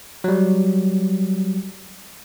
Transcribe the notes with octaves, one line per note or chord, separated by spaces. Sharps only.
F#3 G3